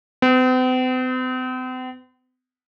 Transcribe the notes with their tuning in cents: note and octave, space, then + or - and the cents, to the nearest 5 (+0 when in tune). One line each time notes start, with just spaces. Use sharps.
C4 -45